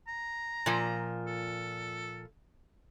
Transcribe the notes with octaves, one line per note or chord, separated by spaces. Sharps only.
A#5
A#2 F3
A4